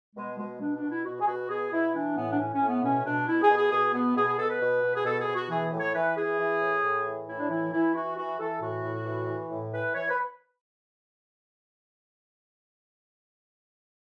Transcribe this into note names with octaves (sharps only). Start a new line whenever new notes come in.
B2 G#3
B2 G#3
B2 D4
D4
B2
E4
B2 F#4
G#4
B2 F#4
B2 G#4
B2 E4
E3 D4
A2 B3
D4
A2 C#4
C#4
A2
B3
B2 C#4
B2 D4
B2 E4
G#4
B2
G#4
B2 G#4
B2 B3
B2 G#4
G#4
B2 A4
B4
B2
B2
G#4
B2 A4
G#4
B2
F#4
E3 G#4
A2
C#5
E3 B4
E3 G#4
E3
A2
A2
E3
A2 E4
D4
E3 E4
E3 E4
E3 F#4
E3 F#4
E3 A4
A2 F#4
A2
E3
E3
A2
E3 B4
E3 C#5
B4